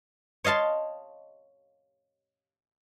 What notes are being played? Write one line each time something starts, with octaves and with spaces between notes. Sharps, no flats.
C#5 D#5 F5 A5 C6